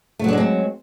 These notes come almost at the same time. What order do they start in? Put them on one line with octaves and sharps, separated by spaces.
A3 F#3 D4 G#3 C4